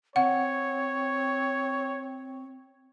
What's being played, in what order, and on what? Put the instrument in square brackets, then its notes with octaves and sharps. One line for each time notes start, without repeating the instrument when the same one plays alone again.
[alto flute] C4 [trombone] C#5 [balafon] F#5